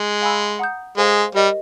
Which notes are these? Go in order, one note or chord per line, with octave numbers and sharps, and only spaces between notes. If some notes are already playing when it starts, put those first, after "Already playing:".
Already playing: G#3
F5 G#5 B5 E6
F#5 A#5 D#6 G6
G#3 A4 C5 F5 G#5
G3 G4 A#4 D#5